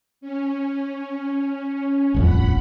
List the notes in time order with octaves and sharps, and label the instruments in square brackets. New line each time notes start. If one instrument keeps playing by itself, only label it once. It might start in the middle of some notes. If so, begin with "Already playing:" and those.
[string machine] C#4
[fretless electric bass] D#1 A1 F2 [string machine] F#5 B5